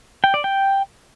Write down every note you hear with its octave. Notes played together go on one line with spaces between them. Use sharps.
G5
D5
G5